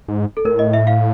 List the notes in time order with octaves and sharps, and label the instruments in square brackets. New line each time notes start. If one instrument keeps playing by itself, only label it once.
[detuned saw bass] G#2
[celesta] A4
[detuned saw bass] A2 [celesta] A#4
[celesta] D#5
E5
F5